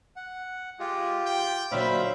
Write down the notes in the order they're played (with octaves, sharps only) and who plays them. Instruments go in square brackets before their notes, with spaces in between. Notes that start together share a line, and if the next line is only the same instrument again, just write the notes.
[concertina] F#5
[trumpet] G#3 [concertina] F4 G4
[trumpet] G5
[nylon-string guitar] A#2 D3 F#3 [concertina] C5 E5 F5 [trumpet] B5